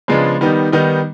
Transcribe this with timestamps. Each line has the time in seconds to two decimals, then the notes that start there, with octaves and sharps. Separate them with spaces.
0.08 C#3 F3 G#3 B3 D4
0.41 D#3 G3 B3 D#4
0.72 D#3 G3 B3 D#4